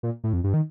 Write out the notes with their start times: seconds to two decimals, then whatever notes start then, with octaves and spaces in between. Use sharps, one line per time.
0.03 A#2
0.24 A2
0.33 F2
0.44 G2
0.54 D#3